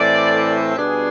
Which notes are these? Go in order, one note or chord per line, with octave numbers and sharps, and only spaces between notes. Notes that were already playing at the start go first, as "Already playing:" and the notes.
Already playing: A2 E3 A3 C4 D5
B2 G3 B3 D4 G#4